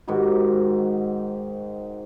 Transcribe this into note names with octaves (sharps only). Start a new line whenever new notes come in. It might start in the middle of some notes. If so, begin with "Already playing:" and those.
G#2 D#3 F#4 G4